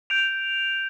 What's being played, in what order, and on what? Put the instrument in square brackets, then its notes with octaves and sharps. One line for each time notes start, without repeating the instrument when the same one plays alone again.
[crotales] G6 D7 F7